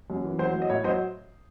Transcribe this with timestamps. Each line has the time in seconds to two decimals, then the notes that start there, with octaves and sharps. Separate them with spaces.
0.10 F#2
0.25 E3
0.39 F#3 C5
0.54 F#3
0.62 D#5
0.70 A2 C#5
0.84 F#3 C5 D#5